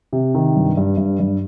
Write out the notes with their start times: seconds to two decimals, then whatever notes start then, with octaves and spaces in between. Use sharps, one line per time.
0.13 C3
0.35 D#3
0.56 G2
0.77 G2
0.97 G2
1.20 G2